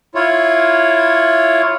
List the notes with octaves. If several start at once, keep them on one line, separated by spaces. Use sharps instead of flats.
E4 F4 C#5